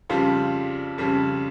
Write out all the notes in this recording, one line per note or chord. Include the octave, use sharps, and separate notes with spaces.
F2 C#3 G3 F4
F2 C#3 G3